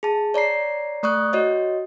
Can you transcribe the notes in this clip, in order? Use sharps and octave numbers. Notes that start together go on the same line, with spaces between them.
G#4 A5
C#5 D5 A#5 C7
A3 D5 C#6 D#6 F#6
F#4 C#5 D#5